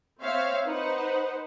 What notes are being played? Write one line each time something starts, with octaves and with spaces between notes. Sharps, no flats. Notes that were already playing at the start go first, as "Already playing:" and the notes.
C4 C#5 E5 F5
D#4 B4 C5 F#5